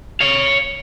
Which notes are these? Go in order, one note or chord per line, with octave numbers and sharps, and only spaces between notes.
C#5 F5